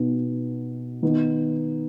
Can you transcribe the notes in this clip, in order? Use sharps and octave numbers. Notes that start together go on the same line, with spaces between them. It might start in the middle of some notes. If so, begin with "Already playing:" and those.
Already playing: B2 B3 D#4
D#3 B3 D#4